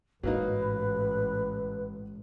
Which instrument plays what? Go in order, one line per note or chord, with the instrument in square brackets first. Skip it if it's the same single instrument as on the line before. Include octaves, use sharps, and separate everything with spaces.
[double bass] A1 [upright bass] G#2 [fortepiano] F#3 A#3 D#4 [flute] B4